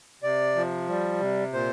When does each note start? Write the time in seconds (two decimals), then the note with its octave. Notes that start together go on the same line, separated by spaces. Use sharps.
0.23 C3 D5
0.56 F3
0.89 G3
1.20 C3
1.53 A#2 C5